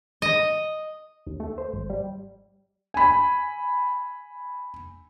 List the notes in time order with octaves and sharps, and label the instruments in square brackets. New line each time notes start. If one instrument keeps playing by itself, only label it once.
[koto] D#5
[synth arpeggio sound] D#2
A3
C5
G#1
G3
[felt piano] G#5 B5